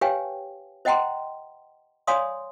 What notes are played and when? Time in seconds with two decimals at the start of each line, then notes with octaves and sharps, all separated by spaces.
0.01 G4 B4 C#5 F5 G5 G#5
0.85 C5 D#5 F#5 G5 A#5 C6
2.07 C#5 D5 F5 G#5 C6 D#6